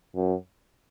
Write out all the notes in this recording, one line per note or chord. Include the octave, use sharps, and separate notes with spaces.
F#2